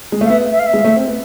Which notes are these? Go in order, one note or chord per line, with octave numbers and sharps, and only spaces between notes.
G#3
A3
F5
B3 E5
E5
F5
E5
G#3
A3
C4
B3